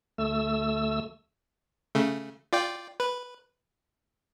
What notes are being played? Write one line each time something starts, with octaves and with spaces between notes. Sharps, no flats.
D2 A3 E6
C#3 A3
F4 D5 G5
B4